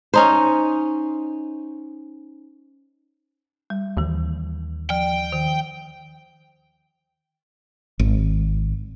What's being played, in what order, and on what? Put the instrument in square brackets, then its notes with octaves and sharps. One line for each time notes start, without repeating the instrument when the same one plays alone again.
[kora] C#4 D#4 C5
[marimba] G3
[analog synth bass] D#2 [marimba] D#3 E3
[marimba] F3 [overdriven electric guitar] G5
[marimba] D#3
[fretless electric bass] G#1